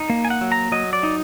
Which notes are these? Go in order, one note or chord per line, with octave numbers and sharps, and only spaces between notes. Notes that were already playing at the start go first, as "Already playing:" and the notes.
Already playing: D#4
A#3
G#5
F#5
F#3
A#5
F#3 D#5
D5
D#4